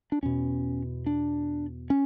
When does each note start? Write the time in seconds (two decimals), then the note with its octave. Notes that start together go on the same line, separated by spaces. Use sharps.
0.12 D4
0.23 E2 B2 C#4
1.06 D4
1.90 C#4